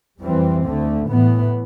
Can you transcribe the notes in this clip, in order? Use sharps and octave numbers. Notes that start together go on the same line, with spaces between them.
F2 E3 G3 C4
D2 D3 A3
A2 E3 B3